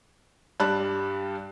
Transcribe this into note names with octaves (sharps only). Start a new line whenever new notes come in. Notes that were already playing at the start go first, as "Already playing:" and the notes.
G2 G3 D4 A5 B5 F#6